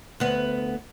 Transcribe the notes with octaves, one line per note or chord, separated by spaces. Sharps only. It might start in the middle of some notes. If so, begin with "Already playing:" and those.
D2 B3